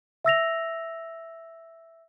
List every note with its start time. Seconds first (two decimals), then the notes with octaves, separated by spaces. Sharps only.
0.25 E5 E6 A#6 F7